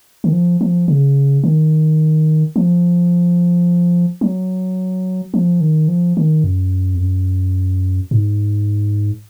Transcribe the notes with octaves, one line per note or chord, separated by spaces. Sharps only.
D#3
F3
F3
C#3
D#3
F3
F#3
F3
D#3
F3
D#3
F#2
F2
F#2
G#2